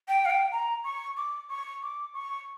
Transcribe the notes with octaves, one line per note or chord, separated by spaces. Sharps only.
G5
F5
G5
A#5
C#6
D6
C#6
D6
C#6